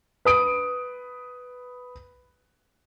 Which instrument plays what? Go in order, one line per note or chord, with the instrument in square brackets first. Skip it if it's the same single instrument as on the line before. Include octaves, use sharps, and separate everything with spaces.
[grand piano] B4 D#6 D7